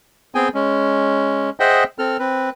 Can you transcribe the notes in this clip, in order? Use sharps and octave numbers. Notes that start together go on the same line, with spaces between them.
B3 C4 G#4 G5 G#5
G#3 C#4
G#4 C5 D#5 E5 F#5 G5
C4 A4 F6
C4 B4